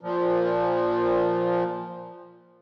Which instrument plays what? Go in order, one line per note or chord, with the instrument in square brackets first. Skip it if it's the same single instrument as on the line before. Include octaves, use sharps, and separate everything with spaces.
[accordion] A#2 F3